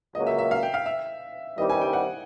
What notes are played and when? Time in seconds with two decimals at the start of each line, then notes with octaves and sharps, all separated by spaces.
0.15 C#2 C#3 F#3 A#3 D#5
0.27 E5
0.38 E5
0.51 F5
0.63 G5
0.74 F5
0.86 E5
1.58 G2 D#3 G3 C4 E4 D#5
1.70 G#5
1.81 G5
1.93 F#5